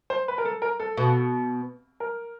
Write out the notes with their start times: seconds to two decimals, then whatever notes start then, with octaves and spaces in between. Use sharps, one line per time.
0.10 C5
0.28 B4
0.38 A#4
0.45 A4
0.62 A#4
0.80 A4
0.97 B2
2.00 A#4